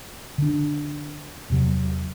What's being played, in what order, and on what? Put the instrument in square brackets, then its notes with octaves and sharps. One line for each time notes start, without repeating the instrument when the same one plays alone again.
[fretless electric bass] D3 D4
E2 C3 F#3